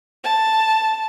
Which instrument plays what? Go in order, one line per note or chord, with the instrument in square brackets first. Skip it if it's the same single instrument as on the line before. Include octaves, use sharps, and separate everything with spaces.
[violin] A5